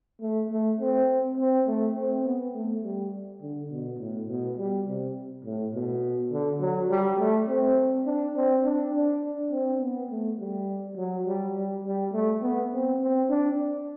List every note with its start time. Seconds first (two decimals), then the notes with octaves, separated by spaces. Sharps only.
0.21 A3
0.50 A3
0.80 C4
1.38 C4
1.67 A3
1.96 C4
2.25 B3
2.54 A3
2.83 G3
3.41 D3
3.70 B2
3.99 A2
4.28 B2
4.58 G3
4.86 C3
5.45 A2
5.73 B2
6.32 D3
6.60 F#3
6.90 G3
7.18 A3
7.48 C4
8.06 D4
8.36 C4
8.64 D4
8.94 D4
9.51 C4
9.80 B3
10.10 A3
10.39 G3
10.97 F#3
11.26 G3
11.55 G3
11.84 G3
12.13 A3
12.42 B3
12.72 C4
13.01 C4
13.30 D4